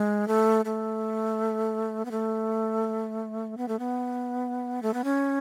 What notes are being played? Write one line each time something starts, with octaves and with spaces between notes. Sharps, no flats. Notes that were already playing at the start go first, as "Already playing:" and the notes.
Already playing: G#3
A3
A3
B3
A3
B3
A3
B3
A3
B3
C#4